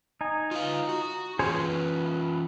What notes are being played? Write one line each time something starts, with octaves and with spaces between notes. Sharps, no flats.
D#4 G#5
F4 B4 F5
F#4
E3 C#4 F4 G#4 C5 C#5
B4